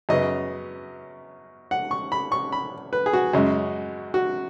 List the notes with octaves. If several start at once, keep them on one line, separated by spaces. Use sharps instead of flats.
F#2 C#3 B3 D#5
F#5
C#6
B5
C#6
B5
B4
G#4
F#4
F#2 C#3 G#3
F#4